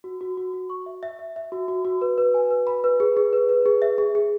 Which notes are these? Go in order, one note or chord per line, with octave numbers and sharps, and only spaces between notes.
F#4
F#4
F#4
F#4
C#6
E5
E5
E5
E5
F#4
F#4
F#4
B4
B4
G#5
B4
B5
B4
G#4
G#4
B4
B4
G#4
E5
G#4
G#4